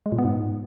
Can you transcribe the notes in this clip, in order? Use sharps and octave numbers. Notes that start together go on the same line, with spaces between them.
G#3
A#2
B3
G#2